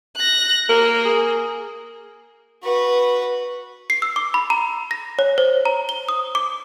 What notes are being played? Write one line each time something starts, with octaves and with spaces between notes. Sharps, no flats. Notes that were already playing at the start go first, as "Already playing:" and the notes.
F#6 A#6
A#3 A#4
G#4
F#4 B4
C7
E6
D6
B5
A#5
A#6
C#5
C5
A#5
G7
D#6
D6